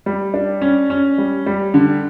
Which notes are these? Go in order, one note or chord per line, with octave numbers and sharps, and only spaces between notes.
G3
D4
C#4
C#4
G3
G3
D3